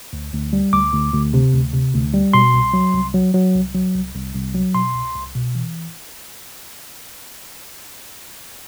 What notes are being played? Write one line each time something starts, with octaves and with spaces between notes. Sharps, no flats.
D2
D2
G3
D2 D6
D2
D2
C3
D2
C3
D2
G3
B2 C6
C2
F#3
C2
F#3
F#3
C2
F#3
C2
C2
C2
F#3
B2 C6
C2
C2
B2
E3